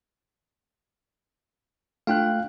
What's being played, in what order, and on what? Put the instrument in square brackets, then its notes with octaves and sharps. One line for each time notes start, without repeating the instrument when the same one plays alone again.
[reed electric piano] A3 G5 F#6 [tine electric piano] D4 F4 F5